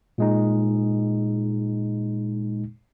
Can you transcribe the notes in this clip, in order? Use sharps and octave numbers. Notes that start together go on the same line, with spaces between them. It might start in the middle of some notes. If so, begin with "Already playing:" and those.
A#2 G#3 D#4